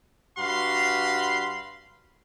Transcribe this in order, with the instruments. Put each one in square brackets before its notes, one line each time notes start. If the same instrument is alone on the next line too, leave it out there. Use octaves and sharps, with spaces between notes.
[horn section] G2 F#4 F5 B5 C6